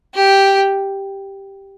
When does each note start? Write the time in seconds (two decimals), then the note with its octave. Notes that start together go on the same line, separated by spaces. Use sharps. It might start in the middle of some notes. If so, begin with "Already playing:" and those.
0.15 G4